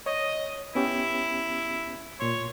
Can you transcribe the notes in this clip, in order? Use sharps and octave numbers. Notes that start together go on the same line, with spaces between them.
C#5 D#5
B3 C#4 E4 G4
A#2 C#5 C6